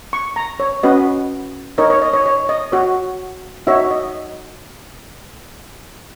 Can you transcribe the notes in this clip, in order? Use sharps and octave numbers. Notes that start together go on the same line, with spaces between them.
C#6
A#5
C#5
C#4 F#4 B4 D#5
D#4 A#4 C#5 D#5
C#5
D#5
C#5
C#5
D#5
F#4 C#5
D#4 F#4 C#5 E5
D#5